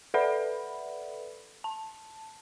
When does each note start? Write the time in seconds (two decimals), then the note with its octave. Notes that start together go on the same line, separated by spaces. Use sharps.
0.14 A4 B4 D5 E5 F#5 B5
1.64 A5